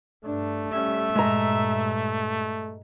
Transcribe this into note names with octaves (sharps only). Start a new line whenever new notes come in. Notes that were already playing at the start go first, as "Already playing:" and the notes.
G2 A3 D4
G3 C#4 E5
G2 A#2 G#3 A#5